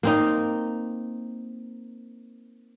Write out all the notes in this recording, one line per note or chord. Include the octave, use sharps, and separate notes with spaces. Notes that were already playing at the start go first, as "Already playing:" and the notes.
A#3 C4 D#4